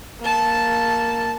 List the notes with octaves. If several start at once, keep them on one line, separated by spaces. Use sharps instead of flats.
A#3 A5